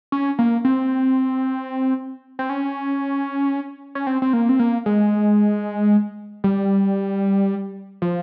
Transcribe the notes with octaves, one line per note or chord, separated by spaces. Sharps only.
C#4
A#3
C4
C4
C#4
C#4
C4
C4
A#3
C4
A#3
G#3
G3
F3